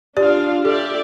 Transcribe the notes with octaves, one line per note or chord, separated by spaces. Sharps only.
D4 F4 G4 D5 F5
G4 A4 D5 E5